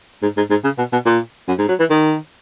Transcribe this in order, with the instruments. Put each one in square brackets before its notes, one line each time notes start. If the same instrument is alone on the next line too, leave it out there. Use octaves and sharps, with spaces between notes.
[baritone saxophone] G#2
G#2
G#2
C#3
B2
B2
A#2
F#2
G#2
F#3
E3
D#3